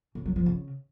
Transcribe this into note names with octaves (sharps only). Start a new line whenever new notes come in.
C#3
F#3
F3
C#3